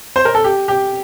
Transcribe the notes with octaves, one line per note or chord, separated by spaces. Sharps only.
C5
A#4
A4
G4
G4